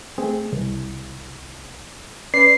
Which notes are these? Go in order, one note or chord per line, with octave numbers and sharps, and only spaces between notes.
A3 C4 G#4
C2
C#4 B4 D5 C7